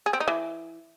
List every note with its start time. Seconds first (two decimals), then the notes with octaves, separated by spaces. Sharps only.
0.06 G#4
0.13 C4
0.20 D#4
0.28 E3